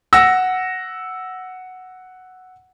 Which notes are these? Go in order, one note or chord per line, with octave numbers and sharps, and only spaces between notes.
F#5 E6 A#6